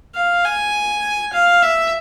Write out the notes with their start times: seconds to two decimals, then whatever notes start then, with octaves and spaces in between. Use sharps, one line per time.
0.15 F5
0.45 G#5
1.33 F5
1.62 E5